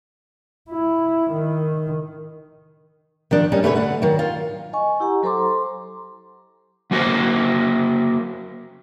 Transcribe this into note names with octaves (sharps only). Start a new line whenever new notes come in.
E4
D#3
D#3 F3 D4
G3 C#4 D#4
B2 A3 C#4 A4 B4 C#5
D3 F#5
D#3 F#3
F4
D#5 G#5 C#6
E4 G4 F#5 A#5
F#3 A4 C5 A#5 C6 D6
C6
F#3 A#3 F#4 A#4 C5 C#5